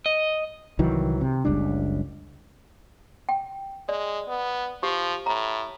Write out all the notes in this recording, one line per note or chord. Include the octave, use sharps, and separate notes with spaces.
D#5
C2 D#3 E3 F#3
C3
F#1 C#2 G3 D4
G5
G#3 D5
B3
F3 G4
A2 A#5